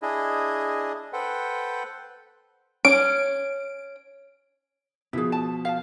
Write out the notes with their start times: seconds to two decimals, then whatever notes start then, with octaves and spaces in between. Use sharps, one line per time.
0.02 D4 E4 G#4 D#5
1.13 A4 B4 C5 F#5 G5
2.85 C#4 D7
5.13 B2 F3 E4 G#4
5.32 A5
5.65 F5 A5